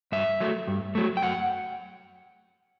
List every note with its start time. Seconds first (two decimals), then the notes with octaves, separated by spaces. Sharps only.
0.12 G2 E5
0.40 F#3 A3
0.67 G2
0.95 F#3 A3
1.17 G5
1.22 F#2 F#5